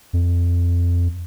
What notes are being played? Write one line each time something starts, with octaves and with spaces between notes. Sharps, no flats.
F2